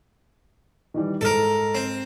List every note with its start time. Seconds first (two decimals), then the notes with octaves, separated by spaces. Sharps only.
0.94 D#3 E3 G3
1.21 G#2 A4 A#4 F6
1.75 C4